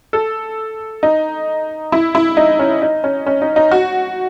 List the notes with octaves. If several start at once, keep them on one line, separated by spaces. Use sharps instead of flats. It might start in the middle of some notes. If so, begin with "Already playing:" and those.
A4
D#4
E4
E4
D#4
C#4
D#4
C#4
C#4
D#4
D#4
F#4